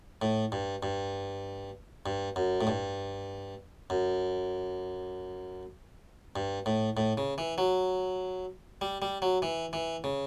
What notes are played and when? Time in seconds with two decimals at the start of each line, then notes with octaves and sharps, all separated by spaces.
0.22 A2
0.52 G2
0.83 G2
2.06 G2
2.36 F#2
2.61 A2
2.67 G2
3.90 F#2
6.36 G2
6.66 A2
6.97 A2
7.18 C#3
7.38 E3
7.58 F#3
8.81 G3
9.02 G3
9.22 F#3
9.42 E3
9.73 E3
10.04 C#3